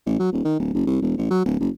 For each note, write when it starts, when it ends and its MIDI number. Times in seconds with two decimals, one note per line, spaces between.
0.06 0.14 33
0.19 0.32 54
0.32 0.40 27
0.45 0.55 51
0.59 0.69 26
0.74 0.84 30
0.87 0.97 36
1.02 1.16 28
1.18 1.27 33
1.31 1.45 54
1.45 1.58 26
1.60 1.70 30